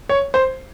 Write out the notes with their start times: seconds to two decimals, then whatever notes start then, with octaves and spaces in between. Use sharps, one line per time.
0.09 C#5
0.34 C5